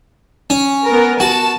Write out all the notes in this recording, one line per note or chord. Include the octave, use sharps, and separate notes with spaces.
C#4
B3 A#4
F#4 A5